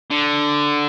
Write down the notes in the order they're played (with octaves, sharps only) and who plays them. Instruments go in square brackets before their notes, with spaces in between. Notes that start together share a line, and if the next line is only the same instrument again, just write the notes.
[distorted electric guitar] D3